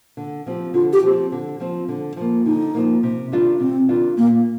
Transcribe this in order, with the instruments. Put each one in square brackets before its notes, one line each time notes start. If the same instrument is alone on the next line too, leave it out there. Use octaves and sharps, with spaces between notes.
[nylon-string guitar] D3
F3 C4 G4
[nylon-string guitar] D3 [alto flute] F4
[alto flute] G4
[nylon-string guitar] F3 C4
D3
F3 C4
D3
F3 A#3
[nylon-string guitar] D3 [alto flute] D#4
[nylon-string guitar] F3 A#3
C3
D#3 G3 D4 F4
[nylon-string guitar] C3 [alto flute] C4
[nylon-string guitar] D#3 G3 D4 F4
[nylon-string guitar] A#2 [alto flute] A#3